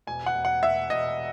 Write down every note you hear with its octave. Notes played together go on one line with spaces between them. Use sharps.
E1 G#5
F#5
E1
F#5
E1 E5
E1 D#5